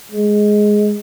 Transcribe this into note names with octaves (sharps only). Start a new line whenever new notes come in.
G#3